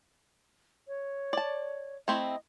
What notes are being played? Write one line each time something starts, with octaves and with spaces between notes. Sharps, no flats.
C#5
D5 A5
A3 C4 E4 D#5